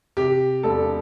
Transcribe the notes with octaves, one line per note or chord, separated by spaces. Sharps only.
C3 G4
E1 A4